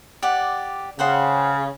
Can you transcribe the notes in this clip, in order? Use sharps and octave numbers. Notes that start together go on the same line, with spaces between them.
G4 D5 F#5
C#3 C5 F#5 G5